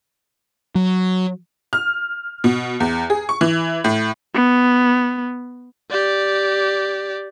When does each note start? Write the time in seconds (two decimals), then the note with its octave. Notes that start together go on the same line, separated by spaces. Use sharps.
0.75 F#3
1.73 F6
2.44 B2
2.80 E2
3.10 G#4
3.29 C#6
3.41 E3
3.84 A2
4.34 B3
5.91 G4 D5